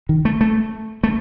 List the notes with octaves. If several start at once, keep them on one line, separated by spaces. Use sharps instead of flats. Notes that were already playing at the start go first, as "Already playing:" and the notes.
D#3
A3
A3
A3